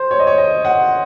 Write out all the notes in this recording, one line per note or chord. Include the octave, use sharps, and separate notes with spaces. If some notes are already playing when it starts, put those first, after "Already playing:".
Already playing: C5
C#5
D#5
C#5
D#5
F#5